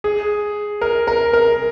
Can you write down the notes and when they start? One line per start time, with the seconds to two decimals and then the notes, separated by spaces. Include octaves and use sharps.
0.04 G#4
0.81 A#4
1.07 A#4
1.33 A#4